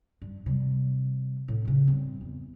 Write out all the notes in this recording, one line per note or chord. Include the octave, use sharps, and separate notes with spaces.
G2
C3 G3
A2
C#3 D#4
G2 C4
E2